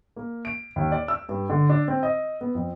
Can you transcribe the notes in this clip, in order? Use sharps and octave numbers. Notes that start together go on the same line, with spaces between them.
A#3
D7
D#2
D5
E6
G2
D3
D4
C4
D#5
B3
F2